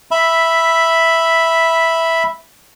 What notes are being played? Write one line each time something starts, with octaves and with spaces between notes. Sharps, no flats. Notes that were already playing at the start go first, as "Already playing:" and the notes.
E5 B5